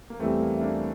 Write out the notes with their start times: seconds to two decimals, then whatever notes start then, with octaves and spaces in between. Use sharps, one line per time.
0.10 A#3
0.19 E2 E3 G3 A3 C4
0.40 A#3
0.55 E4
0.61 A#3 D4